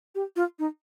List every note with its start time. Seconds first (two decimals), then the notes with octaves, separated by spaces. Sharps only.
0.15 G4
0.36 F4
0.59 D#4